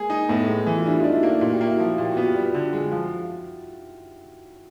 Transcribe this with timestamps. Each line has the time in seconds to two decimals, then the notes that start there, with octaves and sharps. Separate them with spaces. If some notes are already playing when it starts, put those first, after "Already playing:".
Already playing: G#3 A#3 G#4
0.10 D#4
0.29 A2 A3 B3
0.47 G#3
0.67 E3
0.78 F4
0.85 G3 D4 E4
1.00 D#4 F4
1.04 D4
1.13 E4 F#4
1.23 A#3 D#4 F4
1.41 A#2 F#4
1.53 G4
1.61 A#3
1.66 E4 F#4
1.79 F3
1.98 A#2 G4
2.12 F#4
2.17 B3
2.24 F4 G4
2.36 G3
2.54 D3
2.73 G#3
2.91 F3